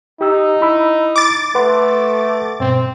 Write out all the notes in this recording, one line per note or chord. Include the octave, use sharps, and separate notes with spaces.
D#4 G4 E6
E4 B5 E6
D6 A6
A3 B4 F#5 C6
G2 B2 C4